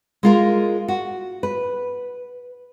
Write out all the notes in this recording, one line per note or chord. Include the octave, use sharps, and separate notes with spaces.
G#3 F4 A#4
F#4
B4